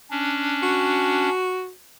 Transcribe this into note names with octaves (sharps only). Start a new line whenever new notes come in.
C#4 D4
F#4